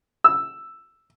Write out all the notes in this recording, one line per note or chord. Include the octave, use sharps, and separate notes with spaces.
E6